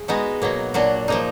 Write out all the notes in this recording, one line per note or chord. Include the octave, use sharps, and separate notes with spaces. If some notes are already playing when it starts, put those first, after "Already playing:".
Already playing: G#4
G#3 B3 D#4 F#4
B2 F#3 A#3
A#2 F#3 D4 F#4
F3 A#3 D#4